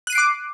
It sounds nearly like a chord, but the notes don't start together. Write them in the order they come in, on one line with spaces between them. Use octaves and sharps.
F#6 D#7 C7 D7 D6